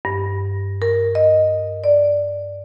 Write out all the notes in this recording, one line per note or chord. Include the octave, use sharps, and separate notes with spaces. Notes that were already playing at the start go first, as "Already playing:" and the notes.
G2
A#4
D#5
D5